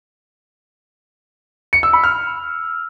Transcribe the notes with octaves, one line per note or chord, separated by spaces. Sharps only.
C#7
E6
B5
F6